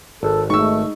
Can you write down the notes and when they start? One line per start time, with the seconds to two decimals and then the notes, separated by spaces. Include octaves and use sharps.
0.23 G#1 A4
0.50 G#3 A3 D#4 C#6 E6